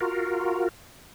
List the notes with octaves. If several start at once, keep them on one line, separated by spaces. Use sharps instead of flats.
F4 F#4 A#4